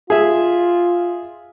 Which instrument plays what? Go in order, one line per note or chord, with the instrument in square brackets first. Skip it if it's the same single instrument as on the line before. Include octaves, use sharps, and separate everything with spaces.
[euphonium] F4 [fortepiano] G#4 E5